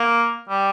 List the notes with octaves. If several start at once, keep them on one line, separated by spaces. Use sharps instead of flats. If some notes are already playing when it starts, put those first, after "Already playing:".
Already playing: A#3
G3